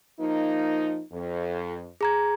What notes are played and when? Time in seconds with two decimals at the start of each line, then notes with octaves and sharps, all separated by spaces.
0.19 F3 A#3 D#4
1.12 F2
2.01 G#4 A#5 G#6